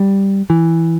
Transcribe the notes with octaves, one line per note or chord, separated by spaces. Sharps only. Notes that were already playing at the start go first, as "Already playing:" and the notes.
Already playing: G3
E3